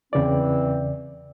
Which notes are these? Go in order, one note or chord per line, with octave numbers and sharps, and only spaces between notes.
E2 C#3 E3 C4 D5